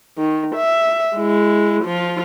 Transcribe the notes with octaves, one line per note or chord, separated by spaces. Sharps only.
D#3
E5
G#3 E4
F3 F4